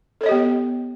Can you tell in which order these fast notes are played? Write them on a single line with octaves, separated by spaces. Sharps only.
A4 C#5 D#5 G4 B3